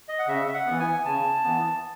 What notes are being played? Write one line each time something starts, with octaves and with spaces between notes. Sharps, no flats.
D#5
F#5
C#3 E5
E5
F#5
E3 B3
G#5
C#3 A5
E3 B3